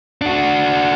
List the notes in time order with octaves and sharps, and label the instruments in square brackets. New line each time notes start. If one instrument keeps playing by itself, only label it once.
[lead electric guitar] D4 F#4